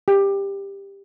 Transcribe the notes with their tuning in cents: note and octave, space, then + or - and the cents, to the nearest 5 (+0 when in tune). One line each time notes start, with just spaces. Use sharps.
G4 +15